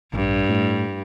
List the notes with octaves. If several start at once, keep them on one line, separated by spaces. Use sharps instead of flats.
A1 G2
A2